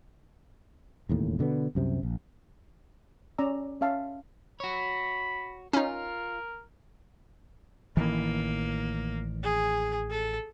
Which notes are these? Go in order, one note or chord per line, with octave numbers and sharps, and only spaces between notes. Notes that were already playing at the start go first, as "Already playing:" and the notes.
E1 D#2 A2
B2 D3 A#3 B3
C2 F#2 C3
A#1
C#4 D5 A#5 E6
C#4 E5 F5 A5
F#4 C#5 B5
C#4 D#4 F4 A#4
A1 D#3 E3 A#3
G#4
A4